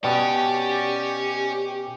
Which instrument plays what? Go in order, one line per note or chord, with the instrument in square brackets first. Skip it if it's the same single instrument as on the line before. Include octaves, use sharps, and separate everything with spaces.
[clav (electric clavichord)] B2 [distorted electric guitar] C#4 [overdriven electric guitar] G4 [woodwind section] D5